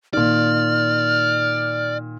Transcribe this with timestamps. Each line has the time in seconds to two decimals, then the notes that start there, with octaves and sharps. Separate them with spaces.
0.13 A#2 D#3 D5 F6